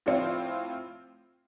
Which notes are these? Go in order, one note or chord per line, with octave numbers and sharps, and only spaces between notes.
A2 F3 C4 F4